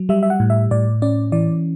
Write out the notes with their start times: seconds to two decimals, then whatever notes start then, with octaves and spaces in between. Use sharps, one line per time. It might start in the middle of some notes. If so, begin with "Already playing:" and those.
Already playing: F#3
0.09 G3 E5
0.23 E5
0.30 F#5
0.40 A2
0.50 E5
0.71 A2 D5
1.02 C#4 D5
1.32 E3 D5